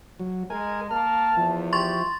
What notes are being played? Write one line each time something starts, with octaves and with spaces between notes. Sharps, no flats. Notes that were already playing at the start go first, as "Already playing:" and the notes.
F#3
G#3 A#4 G#5
A#3 A5 F6
E2 F3 E4
G4 C6 C#6 A6